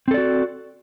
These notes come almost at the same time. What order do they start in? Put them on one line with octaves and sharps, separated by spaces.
C4 A4 D5 F#4